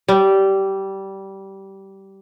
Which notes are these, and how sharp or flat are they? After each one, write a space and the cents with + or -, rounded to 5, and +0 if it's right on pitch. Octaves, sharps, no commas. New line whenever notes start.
G3 -15